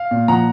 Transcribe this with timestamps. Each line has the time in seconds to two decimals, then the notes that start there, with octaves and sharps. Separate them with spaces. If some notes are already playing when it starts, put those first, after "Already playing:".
Already playing: F5
0.11 A#2
0.28 F3 F#5 A#5